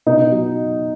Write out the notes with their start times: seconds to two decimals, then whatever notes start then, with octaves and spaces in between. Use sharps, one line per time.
0.06 B2 D#4
0.30 F#3